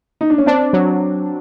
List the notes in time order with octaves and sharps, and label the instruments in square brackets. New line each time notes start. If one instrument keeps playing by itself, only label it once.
[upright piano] D#4
D4
C#4
[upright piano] C4 [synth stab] D4
[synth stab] F#3